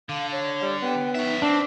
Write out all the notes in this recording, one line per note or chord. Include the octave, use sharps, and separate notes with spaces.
D3 F5
C#5
G3
B3 G5
C#4 D#4 E5
C4 D4 D6